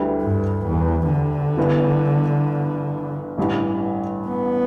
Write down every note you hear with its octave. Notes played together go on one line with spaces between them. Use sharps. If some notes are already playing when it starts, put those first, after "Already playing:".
Already playing: D2 D3 G3 E4 B4
G2
E2
D3
G1 G2 E3 B3
A1 G2 E3
B3